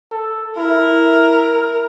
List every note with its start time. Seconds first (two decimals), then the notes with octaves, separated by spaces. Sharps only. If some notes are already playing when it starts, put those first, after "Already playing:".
0.12 A4
0.57 E4 A#4